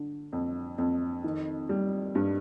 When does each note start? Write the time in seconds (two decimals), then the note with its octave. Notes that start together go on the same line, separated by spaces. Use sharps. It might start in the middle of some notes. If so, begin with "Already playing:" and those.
Already playing: D3
0.33 F2
0.78 F2
1.24 D#3
1.69 G3
2.15 G2